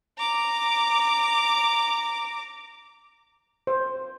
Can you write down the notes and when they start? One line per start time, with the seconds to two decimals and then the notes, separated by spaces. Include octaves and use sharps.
0.18 A#5 D6
3.67 C5